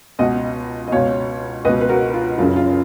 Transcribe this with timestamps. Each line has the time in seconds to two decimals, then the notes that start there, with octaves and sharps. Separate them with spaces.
0.19 C#2 B2 D#5 F#5
0.88 D#5
0.92 C#2 B2 C#5 F5
1.65 C#2 B4 D#5
1.69 B2
1.81 B4
1.89 F#4 A#4
2.14 F4
2.38 F#1 F#2 C#3 F4
2.56 F4